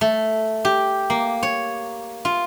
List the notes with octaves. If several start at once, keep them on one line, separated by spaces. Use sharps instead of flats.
A3
G4
A#3
C#5
F4